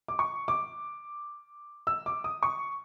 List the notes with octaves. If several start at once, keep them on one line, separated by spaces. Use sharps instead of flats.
D6
C#6
D6
E6
D6
D#6
C#6